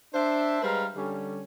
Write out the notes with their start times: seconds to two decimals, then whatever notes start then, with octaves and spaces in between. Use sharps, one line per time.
0.14 D4 C5 E5
0.63 G3 G#3 B4 C5 F5 A#5
0.96 D3 G3 C#4